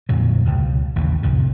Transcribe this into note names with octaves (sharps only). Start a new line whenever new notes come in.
F2 A#2 D3 F#3
C#2 B2
A1 D#2 E3
C2 F2 A2 D3